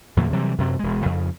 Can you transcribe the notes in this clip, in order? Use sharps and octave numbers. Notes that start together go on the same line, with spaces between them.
E2 A#2 D3 F#3
C3 E3 F#3 G3
F#2 C3 F#3
E1 G#3
F2 C#3